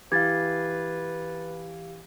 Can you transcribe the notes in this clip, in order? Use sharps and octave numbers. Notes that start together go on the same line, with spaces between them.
E3 G4 B4 F5 G#6 A6